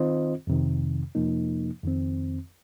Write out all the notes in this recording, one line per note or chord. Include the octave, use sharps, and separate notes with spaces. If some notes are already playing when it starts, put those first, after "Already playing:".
Already playing: D#3 C4 F4 C5 D#5
F2 C3 D#3
F2 C3 F3 A#3 D#4
F2 D#3 C4